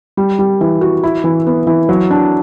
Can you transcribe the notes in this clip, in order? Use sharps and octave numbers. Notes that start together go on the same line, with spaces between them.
G3
G3
E3
F#4
E4
E3
B3
E3
F#3
D4